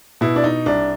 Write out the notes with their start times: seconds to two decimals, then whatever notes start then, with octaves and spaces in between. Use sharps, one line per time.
0.21 B2 E4
0.36 D4
0.44 D#4
0.66 C2 D4